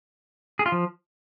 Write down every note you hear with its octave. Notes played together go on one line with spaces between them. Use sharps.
G#4
F4
F3